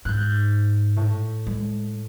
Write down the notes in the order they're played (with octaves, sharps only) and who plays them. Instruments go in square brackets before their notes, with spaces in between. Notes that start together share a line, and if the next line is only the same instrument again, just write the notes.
[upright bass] G#2 [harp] F#6 G6
[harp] A2
[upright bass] G#3